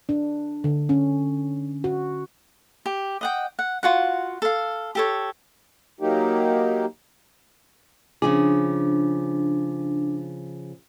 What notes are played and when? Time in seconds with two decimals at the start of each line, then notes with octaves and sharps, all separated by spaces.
0.09 D4
0.64 D3
0.89 C#4
1.84 F#4
2.86 G4
3.21 D#5 F#5 G5
3.59 F#5
3.83 F4 F#4 F#5
4.42 A4 F5
4.95 G4 A4 C#5
6.00 F#3 A#3 D#4 G4
8.22 C#3 F3 D4 G#4